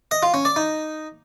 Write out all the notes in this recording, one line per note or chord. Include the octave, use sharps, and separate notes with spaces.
D#5
F4
C#4
D5
D#4